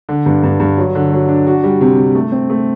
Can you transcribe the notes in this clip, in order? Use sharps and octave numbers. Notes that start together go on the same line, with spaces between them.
D3
G2
G2
G2
F#3
D3
F#3
D4
F#4
G3
C3
C3
A3
C4
A3